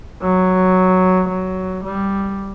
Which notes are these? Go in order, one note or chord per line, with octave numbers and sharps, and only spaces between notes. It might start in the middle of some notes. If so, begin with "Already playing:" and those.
F#3
F#3
G3